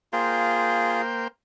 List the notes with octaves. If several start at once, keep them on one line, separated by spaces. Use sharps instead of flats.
A#3 F4 G#4 C5 G5